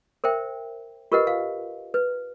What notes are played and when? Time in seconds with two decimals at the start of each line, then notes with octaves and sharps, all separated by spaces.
0.24 A#4 C5 E5 G5
1.12 F4 G4 A#4 B4 D#5 F#5
1.27 F5
1.94 B4